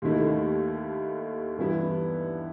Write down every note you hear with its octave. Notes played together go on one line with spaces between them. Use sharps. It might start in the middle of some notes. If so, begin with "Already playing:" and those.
D#2 D#3 A3 E4 A4
G2 E3 B3 E4